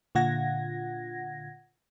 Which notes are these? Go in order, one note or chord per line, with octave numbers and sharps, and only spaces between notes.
A#2 D3 F4 F#5 G#6 A#6